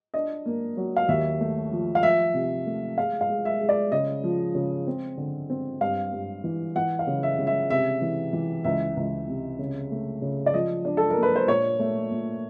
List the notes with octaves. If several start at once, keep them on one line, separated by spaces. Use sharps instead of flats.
D4 D#5
A#3
F#3
F5
D#2 E5
A3
F3
F5
F3 E5
C3
A3
G#3 F5
F5
G#3
E5
G#3
D5
C#3 D#5
F3
C#3
C4
D3
C4
G2 F5
G2
E3
E3 F#5
F5
C#3
E5
C#3
E5
C3 E5
E3
E3
C#2 E5
C#2
C3
C#3
A3
C#3
D5
F3 D#5
D4
A4
A#4
A#3
B4
C5
A#2 C#5
A3
A#2